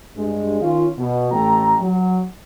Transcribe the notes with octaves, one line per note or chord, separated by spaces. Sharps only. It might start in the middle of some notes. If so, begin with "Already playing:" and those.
G2 G#3
D#3 C#4 F4
B2
A1 A3 G5 A#5
F#3